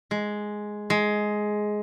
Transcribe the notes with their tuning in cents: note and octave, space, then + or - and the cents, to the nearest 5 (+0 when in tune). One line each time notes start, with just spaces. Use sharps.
G#3 +5
G#3 +10